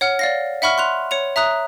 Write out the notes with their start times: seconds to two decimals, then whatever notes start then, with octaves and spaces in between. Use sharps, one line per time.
0.01 C#5 F#5 F6
0.19 D5 F5 A#6
0.62 E5 F#5 B5 C#6 F6
0.78 C6 F#6 F7
1.11 C#5 C#7 F7
1.36 E5 A#5 D#6 F#6